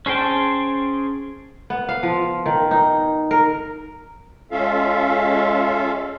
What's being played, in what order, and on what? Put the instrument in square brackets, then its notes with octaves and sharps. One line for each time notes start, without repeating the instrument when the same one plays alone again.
[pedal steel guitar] C#4 G#4 C5 G5 A5
[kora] B3
F5
F3
D#3
D#4
A#4
[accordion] G#3 C#4 F4 A4 E5 F5